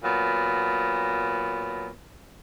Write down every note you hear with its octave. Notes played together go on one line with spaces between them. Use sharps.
A#2 F#3 B3